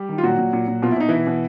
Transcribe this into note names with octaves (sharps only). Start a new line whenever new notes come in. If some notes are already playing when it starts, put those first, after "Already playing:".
Already playing: G3 G4
D#3
F4
A#2 F#3 F#4
A#2
A#2
A#2
B2 F4
E4
B2 D#4
B2 E3 E4
B2